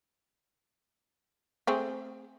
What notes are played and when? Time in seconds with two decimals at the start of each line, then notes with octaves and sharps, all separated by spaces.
1.67 A3 C4 G#4